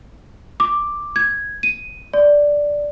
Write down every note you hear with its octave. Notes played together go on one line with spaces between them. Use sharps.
D6
G#6
D#7
D5